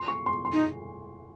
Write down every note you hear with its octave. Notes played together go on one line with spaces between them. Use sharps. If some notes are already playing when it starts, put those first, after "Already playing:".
Already playing: C6
C#6
C6
C6
D#4